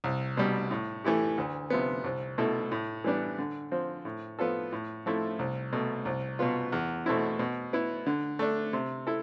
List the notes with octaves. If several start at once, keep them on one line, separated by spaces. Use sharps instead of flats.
C2
B2 G3
A2
E3 A3 E4 G4
D2
C3 F3 B3
C2
B2 A3 E4 A4
A2
E3 G3 B3 D4
D3
F3 C4
A2
F3 B3 F4 A4
A2
F3 A3 C4 E4
C2
B2 A3
C2
B2 B3 F4
E2
B2 A3 C4 E4
B2
B3 E4
D3
A3 D4
C3
E4 A4